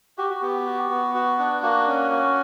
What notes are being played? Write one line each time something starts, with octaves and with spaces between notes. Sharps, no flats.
F#4 G4
F#4
B3 G4
F#4
B3
F#4
D4
A#3 F#4
C#4
F#4